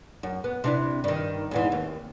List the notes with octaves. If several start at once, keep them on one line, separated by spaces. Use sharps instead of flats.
F#2
B3
C3 D4 E4
G2 D#3
E2 G#2 E3
D#2